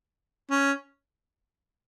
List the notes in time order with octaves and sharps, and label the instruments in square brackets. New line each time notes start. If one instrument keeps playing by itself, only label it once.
[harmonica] C#4